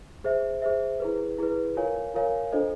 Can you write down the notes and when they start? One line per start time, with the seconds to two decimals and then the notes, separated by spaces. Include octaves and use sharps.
0.24 G#4 C5 E5
0.62 G#4 C5 E5
1.00 E4 G#4 B4
1.38 E4 G#4 B4
1.76 F4 A#4 C#5 F5 G#5
2.14 F4 A#4 C#5 F5 G#5
2.52 D4 F4 A4 C5 D#5